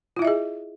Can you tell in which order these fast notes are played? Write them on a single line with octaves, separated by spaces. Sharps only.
F4 E4 E5 D#5 G#4